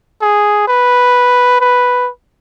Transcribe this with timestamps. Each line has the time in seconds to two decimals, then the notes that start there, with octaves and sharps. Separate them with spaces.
0.22 G#4
0.67 B4
1.61 B4